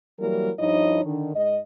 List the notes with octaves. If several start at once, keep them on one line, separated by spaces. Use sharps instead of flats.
E3 F#3 G3 A#3 E4 A#4
G2 F3 D#4 E4 C#5 D#5
D3 D#3
G#2 D#5